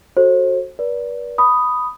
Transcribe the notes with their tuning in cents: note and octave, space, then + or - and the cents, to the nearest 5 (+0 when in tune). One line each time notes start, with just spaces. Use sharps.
F#4 +0 A4 +0 C5 +35
B4 -35 D5 -20
B5 +0 D#6 +0